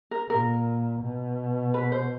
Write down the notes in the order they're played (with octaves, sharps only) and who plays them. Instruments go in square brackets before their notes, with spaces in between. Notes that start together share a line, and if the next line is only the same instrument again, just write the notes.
[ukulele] A#4
[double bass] A#2 [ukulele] A#4
[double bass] B2
[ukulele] B4
C5